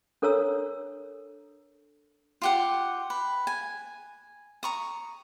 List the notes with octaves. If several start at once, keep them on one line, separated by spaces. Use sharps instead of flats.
D4 A4 A#4 C#5 A#5 E6
F4 G4 F#5
B4
G#5
A#5 C#6 D#6